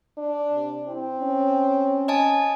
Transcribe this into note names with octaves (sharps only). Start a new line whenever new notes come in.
D4
C3
C4 E4
C#4
D#5 G#5 A5